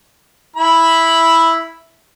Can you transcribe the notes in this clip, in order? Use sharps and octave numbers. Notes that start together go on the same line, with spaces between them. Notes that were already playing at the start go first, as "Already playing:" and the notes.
E4 B5